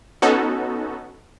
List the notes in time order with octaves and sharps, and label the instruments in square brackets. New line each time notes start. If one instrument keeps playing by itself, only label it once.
[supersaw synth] B3 C#4 D#4 F#4 A4